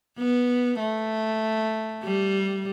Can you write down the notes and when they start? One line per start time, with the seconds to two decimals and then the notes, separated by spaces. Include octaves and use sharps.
0.18 B3
0.79 A3
2.03 G3